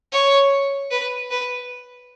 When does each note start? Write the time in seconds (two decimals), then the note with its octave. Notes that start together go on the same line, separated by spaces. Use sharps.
0.12 C#5
0.91 B4
1.31 B4